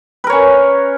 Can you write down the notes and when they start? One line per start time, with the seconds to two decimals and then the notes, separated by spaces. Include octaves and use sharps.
0.24 B4
0.27 A#4
0.30 C#5
0.32 C#4